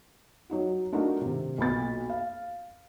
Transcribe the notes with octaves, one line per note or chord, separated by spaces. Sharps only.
F#3 D#4 F#4
A3 D4 D#4 F4 F#4 A#4
C3 D#3
B1 A#2 B5 A6
F5